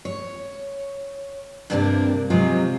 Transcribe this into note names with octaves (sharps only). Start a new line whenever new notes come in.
C#5
G2 C3 A#3 D4 G4 A#4
C3 F#3 G#3 F4